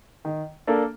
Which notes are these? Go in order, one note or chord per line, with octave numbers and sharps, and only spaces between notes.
D#3
A#3 D4 A4